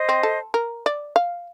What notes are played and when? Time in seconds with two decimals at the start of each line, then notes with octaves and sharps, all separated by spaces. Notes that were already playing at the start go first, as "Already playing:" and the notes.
Already playing: C5 D#5
0.09 C4
0.23 A4
0.54 A#4
0.86 D5
1.16 F5